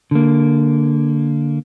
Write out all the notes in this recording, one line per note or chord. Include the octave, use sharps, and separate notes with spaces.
D3 A#3